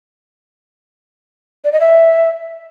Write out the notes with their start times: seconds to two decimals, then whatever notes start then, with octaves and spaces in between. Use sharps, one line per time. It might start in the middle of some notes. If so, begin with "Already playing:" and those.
1.64 D5
1.72 D#5
1.80 E5